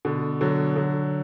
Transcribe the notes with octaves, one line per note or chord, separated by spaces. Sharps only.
B2 D3
D3 F#3
D3 F#3